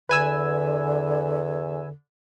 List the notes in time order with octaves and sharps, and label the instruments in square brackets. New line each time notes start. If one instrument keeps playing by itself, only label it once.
[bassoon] E2 [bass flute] D3 [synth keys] B4 G#5 E6